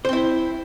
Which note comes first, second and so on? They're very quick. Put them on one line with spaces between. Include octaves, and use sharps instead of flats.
C5 C4 E4